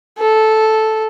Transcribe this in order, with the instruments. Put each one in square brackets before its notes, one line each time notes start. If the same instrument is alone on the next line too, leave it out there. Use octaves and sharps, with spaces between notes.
[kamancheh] A4